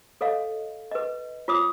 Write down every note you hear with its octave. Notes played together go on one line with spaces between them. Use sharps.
A4 C#5 D#5 F5
B4 D#5
F4 C#5 D6 D#6